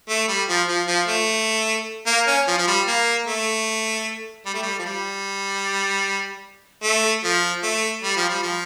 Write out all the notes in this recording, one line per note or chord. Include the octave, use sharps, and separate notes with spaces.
A3
G3
F3
F3
F3
A3
A#3
C#4
F3
F3
G3
A#3
A3
G3
A3
G3
F3
G3
A3
F3
A3
G3
F3
G3
F3